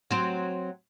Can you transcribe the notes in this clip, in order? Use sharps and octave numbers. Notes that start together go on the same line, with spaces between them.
F#3 C4